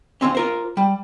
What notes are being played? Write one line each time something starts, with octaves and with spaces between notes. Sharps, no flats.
D#2 A2 C4 C#4
F4 A#4 C5
G3